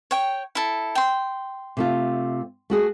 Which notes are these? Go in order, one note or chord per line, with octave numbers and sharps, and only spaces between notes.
C#5 G5
E4 A4
G5 C6
C3 A3 F4
A3 F#4 G#4